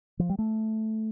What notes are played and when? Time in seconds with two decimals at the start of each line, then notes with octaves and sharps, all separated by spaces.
0.19 F3
0.29 G3
0.39 A3